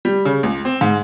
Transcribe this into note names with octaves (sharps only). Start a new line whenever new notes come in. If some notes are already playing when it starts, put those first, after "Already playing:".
G3
C#3
C#2
C4
G#2